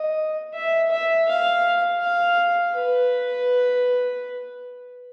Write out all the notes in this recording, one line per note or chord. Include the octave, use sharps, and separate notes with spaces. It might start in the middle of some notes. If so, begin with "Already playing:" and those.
Already playing: D#5
E5
E5
F5
F5
B4